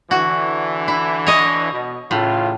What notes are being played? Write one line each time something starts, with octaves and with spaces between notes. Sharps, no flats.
D3 E3 F#4
E4
C#5 D#5
B2
A1 A2 C#3 F4